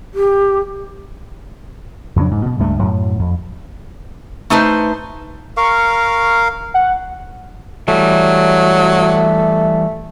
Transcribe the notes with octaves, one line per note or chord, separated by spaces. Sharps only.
G4
F2 C#3 F#3 D4
G#2
B2
C#2 G2 A3
F#2 A2 F#3
F2
A3 D#4 B4 C5
A#4 F5 C#6
F#5
E3 F#3 G3 A3